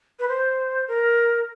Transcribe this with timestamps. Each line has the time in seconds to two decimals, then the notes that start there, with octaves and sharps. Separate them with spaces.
0.19 B4
0.28 C5
0.88 A#4